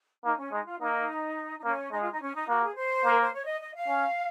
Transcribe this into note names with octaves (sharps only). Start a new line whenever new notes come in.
A#3 D#4
C#4
G#3 D#4
F4
A#3 D#4
D#4
A#3 C#4
G#3 D#4
F4
D#4
C#4
D#4
A#3 F#4
G#4
C5
A#3
A#4
C5
C#5
D#5
D#5
F5
C#4